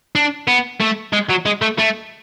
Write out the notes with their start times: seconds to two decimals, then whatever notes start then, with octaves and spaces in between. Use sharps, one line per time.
0.15 D4
0.48 B3
0.81 A3
1.13 G#3
1.29 F#3
1.45 G#3
1.62 A3
1.79 A3